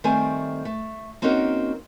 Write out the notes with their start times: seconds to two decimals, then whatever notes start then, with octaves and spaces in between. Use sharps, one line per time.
0.04 D#3 G3 A3 C4 C5 G#5
0.65 A3
1.22 A#3 C4 C#4 D#4 F#4 A#4